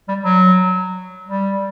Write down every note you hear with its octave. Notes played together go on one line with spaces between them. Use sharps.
G3
F#3
G3